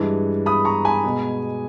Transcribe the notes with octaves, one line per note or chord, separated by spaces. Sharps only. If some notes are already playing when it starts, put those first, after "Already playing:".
Already playing: G2 E3 G#3
B5 D#6
A#5 C#6
G#5 B5
B2 G#3